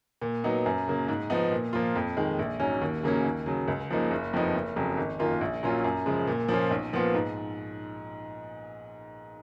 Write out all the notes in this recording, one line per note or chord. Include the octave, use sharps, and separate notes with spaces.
A#2
F#3 B3 D#4
F#2
C#3 F#3 A#3
G#2
F3 B3 D#4
A#2
F3 A#3 F4
F2
D#3 G#3
A#1
G#2 F#3 C#4
D#2
C#3 F#3 A#3 C#4
D#2
C#3 F#3
C#2
C#3 F3 A#3 D#4
F#1
F2 F3 B3 D#4
F#1
F2 C#3 F#3
G#1
F#2 D#3 A#3 F4
A#1
A#2 F#3 C#4 F4
F#2
C#3 F3 G#3
A#2
F3 A#3 C#4 F4
B1
A#2 F3 B3 F4
G#2